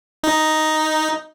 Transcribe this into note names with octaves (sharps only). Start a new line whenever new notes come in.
D#4